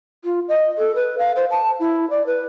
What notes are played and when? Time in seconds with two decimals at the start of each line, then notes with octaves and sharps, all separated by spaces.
0.24 F4
0.48 D#5
0.78 A4
0.95 B4
1.19 F5
1.36 C5
1.51 A5
1.80 E4
2.10 D5
2.27 B4